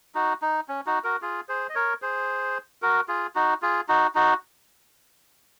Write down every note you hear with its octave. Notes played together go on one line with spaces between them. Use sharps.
D#4 F#4
D#4
C#4
D#4 F#4
F#4 A#4
F4 G#4
G#4 C5
D#5
A#4 C#5
G#4 C5
F#4 A#4
F4 G#4
D#4 F#4
F4 G#4
D#4 F#4
D#4 F#4